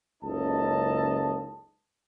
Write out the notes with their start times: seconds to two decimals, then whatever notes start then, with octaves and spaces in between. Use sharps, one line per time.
0.23 F#1 C#2 D#4 A4 D#5 A5